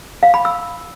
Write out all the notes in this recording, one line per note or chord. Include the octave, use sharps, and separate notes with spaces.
F5
B5
E6